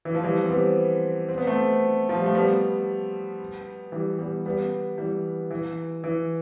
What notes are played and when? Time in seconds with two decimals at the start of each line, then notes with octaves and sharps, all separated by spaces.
0.05 E3
0.15 F3
0.23 E3 G3
0.43 C4
0.50 G3 B3
1.29 C4
1.38 B3
1.46 A3 C4
2.09 F3
2.17 G3
2.26 A3
2.35 G3 B3
3.92 E3 G3
4.19 G3 B3
4.46 G3 B3
4.98 E3 G3
5.51 E3
6.04 E3